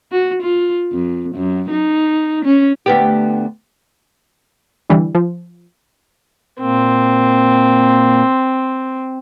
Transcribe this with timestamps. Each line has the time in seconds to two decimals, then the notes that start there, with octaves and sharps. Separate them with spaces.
0.12 F#4
0.43 F4
0.93 F2
1.35 F#2
1.70 D#4
2.45 C#4
2.86 D2 B3 G4
4.90 D3 E3 G3
5.15 F3
6.60 A#2 A#3 C4